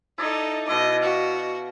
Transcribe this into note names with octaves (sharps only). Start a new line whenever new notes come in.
D#4 E4 A4 D5 D#5
B2 E4 D#5 D6
F#4 F5